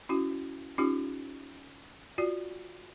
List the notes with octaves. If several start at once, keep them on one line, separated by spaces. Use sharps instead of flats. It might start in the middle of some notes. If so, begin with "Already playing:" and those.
C#4 E4 F#4
C#4 D#4 F4 G4
F4 F#4 D5